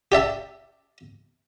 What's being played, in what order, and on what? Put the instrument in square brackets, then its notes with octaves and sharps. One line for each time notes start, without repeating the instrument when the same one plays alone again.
[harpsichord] G4 D5 E5 A5